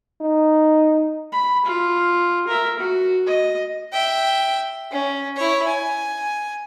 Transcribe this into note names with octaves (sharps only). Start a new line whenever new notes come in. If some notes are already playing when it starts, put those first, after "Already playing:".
D#4
B5
F4
A#4 E5
F#4
D#5
E5 G5
C#4
E4 C#5
G#5